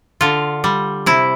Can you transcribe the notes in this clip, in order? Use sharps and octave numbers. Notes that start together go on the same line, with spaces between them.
D3 F4
G3
C3 E4